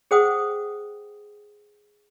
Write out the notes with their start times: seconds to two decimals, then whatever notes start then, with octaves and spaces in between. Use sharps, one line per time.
0.11 G#4 C5 F#5 G5 D#6